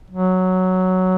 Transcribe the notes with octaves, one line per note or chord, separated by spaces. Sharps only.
F#3